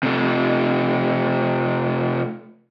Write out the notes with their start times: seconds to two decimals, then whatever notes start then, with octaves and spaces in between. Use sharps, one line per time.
0.03 C3 A3